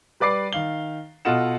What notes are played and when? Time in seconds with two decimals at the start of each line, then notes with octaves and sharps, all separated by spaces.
0.20 G3 B4 D5 D6 C7
0.53 D#3 F5 G7
1.25 B2 F4 A4 D#5 F#5 E7